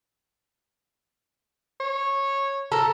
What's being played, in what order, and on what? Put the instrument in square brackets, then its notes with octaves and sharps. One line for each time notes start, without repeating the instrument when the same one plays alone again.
[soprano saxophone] C#5
[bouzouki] A4 A#4